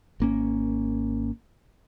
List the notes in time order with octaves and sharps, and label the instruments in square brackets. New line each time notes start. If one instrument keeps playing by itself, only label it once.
[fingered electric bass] G#1 A#3 C#4